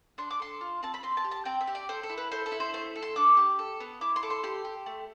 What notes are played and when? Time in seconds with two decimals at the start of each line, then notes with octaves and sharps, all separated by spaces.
0.18 D4 C6
0.30 D6
0.40 A4 C6
0.61 F4
0.83 C4 A5
0.94 B5
1.03 C4 C6
1.17 A5
1.24 G4
1.31 A5
1.45 C4 G5
1.61 E5
1.67 G4
1.75 D5
1.89 A4 C5
2.03 A4
2.10 E4
2.17 B4
2.32 A4 C5
2.46 A4
2.52 E4
2.60 C5
2.74 A3 C5
2.96 A4
3.02 C6
3.16 D4 D6
3.37 G4
3.59 A4
3.80 B3
4.01 E4 D6
4.16 C6
4.23 A4 D6
4.30 C6
4.43 G4 C6
4.65 G4
4.86 A3